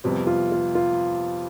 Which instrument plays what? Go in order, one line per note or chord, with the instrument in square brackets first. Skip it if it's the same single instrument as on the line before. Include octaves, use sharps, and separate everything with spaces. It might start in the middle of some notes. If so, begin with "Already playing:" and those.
[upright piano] F2 C3 G3 B3
[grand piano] F4
F4
F4